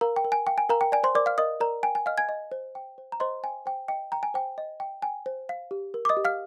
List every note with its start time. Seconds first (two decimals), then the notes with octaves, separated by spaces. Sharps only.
0.01 A#4 F5 A#5
0.16 G5
0.25 A#4
0.32 G#5
0.47 F5 G5
0.58 G#5
0.69 A#4 F5 A#5
0.81 G5
0.92 D5 G#5
1.04 C5 C6
1.15 A#4 D5 D6
1.26 F5 F6
1.38 A#4 D#5 D#6
1.60 A#4 D5 A#5
1.83 G5 G#5
1.95 G#5
2.06 D#5 F5 F6
2.18 G#5 G#6
2.29 D#5
2.52 C5
2.75 G5
2.98 C5
3.12 A#5
3.20 C5 D#5 C6
3.44 G5 G#5
3.66 C5 G5
3.88 D#5 G5
4.12 G5 A#5
4.23 G#5
4.34 C5 G5
4.58 D#5
4.80 G5
5.02 G5 G#5
5.26 C5
5.49 F5
5.71 G4
5.94 A#4
6.05 D6
6.09 D#5 D#6
6.17 G4
6.25 F5 F6